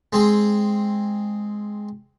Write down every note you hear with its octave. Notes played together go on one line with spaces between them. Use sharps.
G#3 C4 G#4